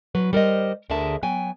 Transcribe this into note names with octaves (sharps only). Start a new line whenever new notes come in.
B2 F#3 B4
G3 A#4 C5 D#5
D2 D3 G#4 A#4 E5 A5
F#3 B3 G5 G#5